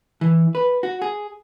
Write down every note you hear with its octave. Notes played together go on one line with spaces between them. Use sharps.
E3
B4
F#4
G#4